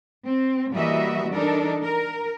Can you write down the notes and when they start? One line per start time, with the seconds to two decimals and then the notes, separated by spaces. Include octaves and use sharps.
0.25 C4
0.73 E3 G3 A#3 F#4 D#5 E5
1.32 E3 D4 D#4 A4 A#4
1.82 A#4